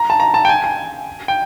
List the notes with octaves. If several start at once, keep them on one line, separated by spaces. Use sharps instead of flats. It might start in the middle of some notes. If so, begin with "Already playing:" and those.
Already playing: A#5
A5
A#5
A5
G5
G#5
G#5
G5